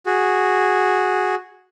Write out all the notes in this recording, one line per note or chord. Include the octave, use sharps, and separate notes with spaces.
F#4 G#4